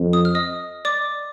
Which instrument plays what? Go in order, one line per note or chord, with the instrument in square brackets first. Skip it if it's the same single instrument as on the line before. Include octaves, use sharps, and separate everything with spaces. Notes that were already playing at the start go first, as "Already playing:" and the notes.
Already playing: [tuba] F2
[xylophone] D#6
F6
D#5 D#6
D5 D6